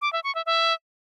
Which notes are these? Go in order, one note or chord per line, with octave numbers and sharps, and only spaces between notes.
D6
E5
C#6
E5
E5